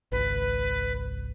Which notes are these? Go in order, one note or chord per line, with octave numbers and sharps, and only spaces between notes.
G#1 C#2 B4